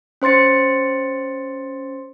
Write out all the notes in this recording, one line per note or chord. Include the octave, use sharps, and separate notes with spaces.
C#4 C5 C6 A6 C#7